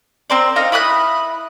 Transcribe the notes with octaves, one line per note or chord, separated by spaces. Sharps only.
C4 A#4 C5 D5
D#4 F5 A#5
E4 B5 D#6 F#6